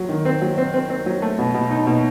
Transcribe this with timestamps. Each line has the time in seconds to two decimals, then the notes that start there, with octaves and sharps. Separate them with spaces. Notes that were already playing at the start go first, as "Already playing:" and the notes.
Already playing: F#3
0.09 D#3
0.25 C4
0.42 F#3
0.58 C4
0.74 C4
0.90 C4
1.06 F#3
1.22 A3
1.39 B2
1.54 B2
1.71 D#4
1.87 B2